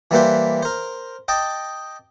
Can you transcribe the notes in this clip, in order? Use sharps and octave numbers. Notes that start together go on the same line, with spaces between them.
E3 G3 A#3 E4 B4 C5
A#4 C5
D#5 G5 A5 D6